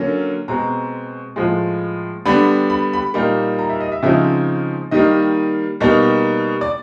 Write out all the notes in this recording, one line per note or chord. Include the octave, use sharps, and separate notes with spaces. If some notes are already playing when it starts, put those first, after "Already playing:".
Already playing: D3 F#3 A#3 C#4
B2 G#3 C4 A#5
A2 F3 G#3
D3 G3 B3 D4 B5
B5
B5
A#2 G3 A#3 D#4
A#5
E5
D#5
E5
C#3 F3 G#3 C4 D#4 E5
D#3 G3 A#3 D#5
B2 G3 A#3 D#4
D5